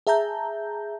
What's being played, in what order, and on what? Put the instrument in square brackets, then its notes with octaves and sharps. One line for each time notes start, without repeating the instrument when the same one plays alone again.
[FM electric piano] G#4 E5 A5 A#5 G6